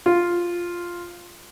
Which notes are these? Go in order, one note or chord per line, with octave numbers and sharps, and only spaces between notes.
F4